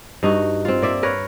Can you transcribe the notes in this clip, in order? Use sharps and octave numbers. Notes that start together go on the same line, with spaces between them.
G2 D#4 F#4
C4 F4
A#3 D5 E5
A#4 B4 C#5